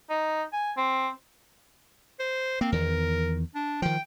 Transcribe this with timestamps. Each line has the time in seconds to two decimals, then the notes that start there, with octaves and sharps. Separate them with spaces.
0.10 D#4
0.53 G#5
0.77 C4
2.19 C5
2.61 A#3 C4
2.72 E2 D#3 A#4
3.55 D4
3.82 D#3 F3 G5